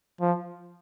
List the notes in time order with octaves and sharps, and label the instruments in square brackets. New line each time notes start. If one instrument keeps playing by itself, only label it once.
[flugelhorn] F3